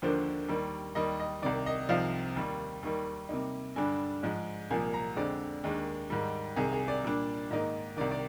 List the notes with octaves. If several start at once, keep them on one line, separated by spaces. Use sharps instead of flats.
D#2 D3 F3 A#3 D4 C5
D#2 D#3 G3
D#2 D#3 G3 D#5
D#5
C2 C3 D#3 D5
D#5
C2 C3 F3 C4 D#4 F5
D#2 D#3 G3
D#2 D#3 G3
C3 G3 A#3 D#4
G2 D3 G3 D4 G#5
G#2 F3 G#3
C2 A#2 F3 A#3 G#5
A#5
F2 D3 G#3 C4 D5
D#2 D#3 G#3 D4
G#2 D#3 G3
C2 C3 D#3 G#4
G#4
D5
A#2 G3 D4
G#2 D#3 A#3 D#4
C2 C3 D#3 D5
D5